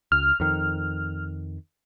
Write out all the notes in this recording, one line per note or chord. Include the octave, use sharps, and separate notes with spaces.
C#2 F6
F2 D#3